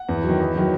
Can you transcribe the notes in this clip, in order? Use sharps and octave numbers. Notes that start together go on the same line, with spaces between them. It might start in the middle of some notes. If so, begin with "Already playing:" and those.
Already playing: F#5
E2
D#3 F#3
E2
D#3 F#3